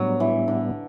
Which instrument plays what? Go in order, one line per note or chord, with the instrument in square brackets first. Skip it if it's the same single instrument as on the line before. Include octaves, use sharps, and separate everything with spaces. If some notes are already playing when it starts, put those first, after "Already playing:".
Already playing: [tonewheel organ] A2 G3 B3 D4 [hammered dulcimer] F#3
[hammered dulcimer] E3
D3